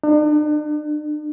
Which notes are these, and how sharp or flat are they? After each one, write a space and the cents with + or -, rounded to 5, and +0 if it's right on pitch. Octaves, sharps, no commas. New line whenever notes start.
D4 +45